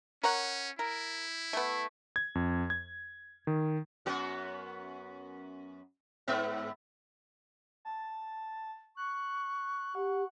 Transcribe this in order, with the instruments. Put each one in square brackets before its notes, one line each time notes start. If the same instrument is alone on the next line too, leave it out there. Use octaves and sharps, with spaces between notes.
[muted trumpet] C#4 [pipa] A#4 C#5 F#5
[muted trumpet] E4 [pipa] A#4
[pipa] A3 B3
[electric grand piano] G#6
F2
G#6
D#3
[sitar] F#2 B3 F#4
G#2 B3 E5
[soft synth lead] A5
[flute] C#6 [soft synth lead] F#6
[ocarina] G4 [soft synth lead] F#5